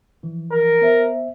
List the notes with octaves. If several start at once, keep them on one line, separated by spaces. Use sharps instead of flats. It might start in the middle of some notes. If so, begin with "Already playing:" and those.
E3 F3
A#4
B3 C5 E5